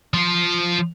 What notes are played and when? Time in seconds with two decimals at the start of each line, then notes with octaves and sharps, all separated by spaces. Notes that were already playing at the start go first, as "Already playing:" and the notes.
0.14 F3 F4